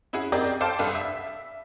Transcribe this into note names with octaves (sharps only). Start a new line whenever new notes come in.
C#4 E4 F#4 G#4
C4 G4 G#4 A#4 D5 D#5
A4 C5 F5 G5 A5 D6
C2 D4 A4 B4 F5
E5